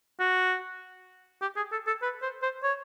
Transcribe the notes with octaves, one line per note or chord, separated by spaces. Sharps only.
F#4
G4
G#4
A4
A4
B4
C5
C5
C#5